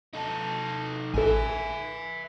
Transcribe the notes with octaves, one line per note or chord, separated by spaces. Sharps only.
D#4 A4
A1 A4 E5 G#5